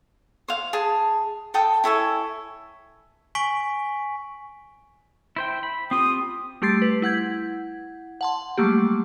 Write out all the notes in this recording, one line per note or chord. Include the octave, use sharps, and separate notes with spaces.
C5 F5
G#4 A5
A4 G5 A5 D#6
E4 A4 C#5 G#5
G#5 C#6 B6 D7 F#7
E4 C5 G5
B5
C4 F4 G4 D#6
G3 A3 G4 C6 A6 C7
B4
E4 F#5 G6 G#6
F#5 A5 C6
F#3 G3 A3 A#3 G4